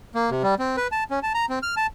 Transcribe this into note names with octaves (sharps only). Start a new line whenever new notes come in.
A#3
C3
G3
C4
B4
A5
C#4
A5
A#5
C4
F6
A5